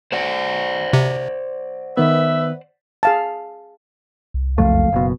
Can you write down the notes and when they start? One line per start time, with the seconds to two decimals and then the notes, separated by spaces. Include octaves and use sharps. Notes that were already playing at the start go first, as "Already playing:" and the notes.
0.12 C5 D5 F#5
0.93 C3
1.97 D#3 B3 B4 E5
3.03 G#4 F5 A5
4.34 C2
4.58 F#1 F2 A3 F5
4.93 F#1 B2